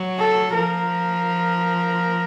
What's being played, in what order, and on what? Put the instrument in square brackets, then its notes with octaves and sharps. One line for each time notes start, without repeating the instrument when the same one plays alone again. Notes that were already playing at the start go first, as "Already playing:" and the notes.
Already playing: [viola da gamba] F#3
[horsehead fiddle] A4
[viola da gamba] F3 [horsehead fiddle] A#4